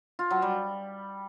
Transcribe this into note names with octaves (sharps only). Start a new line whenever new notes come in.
F4
F#3
G3